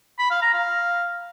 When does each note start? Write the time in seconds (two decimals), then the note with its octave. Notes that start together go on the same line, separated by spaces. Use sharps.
0.19 B5
0.30 F5
0.42 A#5
0.53 F5